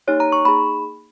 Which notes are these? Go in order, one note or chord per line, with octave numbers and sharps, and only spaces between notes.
A#3 D#4 G4 C#5
A#5
C#6
A#3 D#4 G#4 B5